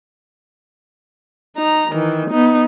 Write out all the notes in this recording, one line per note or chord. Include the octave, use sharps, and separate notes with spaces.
D#4 A#5
D#3 E3
B3 D#4